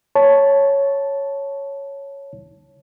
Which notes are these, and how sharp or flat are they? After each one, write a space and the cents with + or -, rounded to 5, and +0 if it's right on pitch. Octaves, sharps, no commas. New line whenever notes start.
C#5 +0 A5 -5